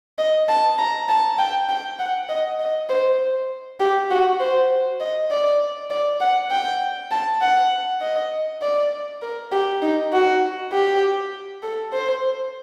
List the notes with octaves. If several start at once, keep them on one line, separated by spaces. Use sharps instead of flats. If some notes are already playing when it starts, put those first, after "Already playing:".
D#5
A5
A#5
A5
G5
G5
F#5
D#5
D#5
C5
G4
F#4
C5
D#5
D5
D5
F#5
G5
A5
F#5
D#5
D5
A#4
G4
D#4
F#4
G4
A4
C5